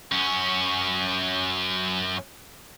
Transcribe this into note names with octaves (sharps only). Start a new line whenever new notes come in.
F#2 C#4